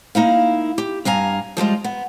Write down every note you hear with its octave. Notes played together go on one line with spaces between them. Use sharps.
A#3 D#4 E4 F5
G4
G2 F5 G#5 A#5
F3 G3 G#3 F4
B3